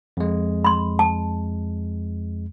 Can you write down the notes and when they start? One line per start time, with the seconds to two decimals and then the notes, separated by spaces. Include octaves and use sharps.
0.17 F2 G#3
0.65 B5 C6
0.99 A5